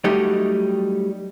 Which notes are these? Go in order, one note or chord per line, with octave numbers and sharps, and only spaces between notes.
F#3 G3 A3 D#4 G4